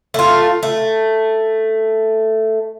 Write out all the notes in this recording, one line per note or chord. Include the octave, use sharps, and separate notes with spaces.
A3 F4
A3